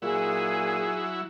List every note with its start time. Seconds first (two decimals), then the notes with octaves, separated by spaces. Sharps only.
0.02 A#2 F#3 E4 G#4